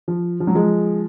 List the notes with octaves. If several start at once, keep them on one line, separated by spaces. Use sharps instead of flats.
F3
F3
F#3
F3 G#3